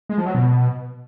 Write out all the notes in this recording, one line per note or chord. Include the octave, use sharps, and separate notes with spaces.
G#3
F3
F#3
B2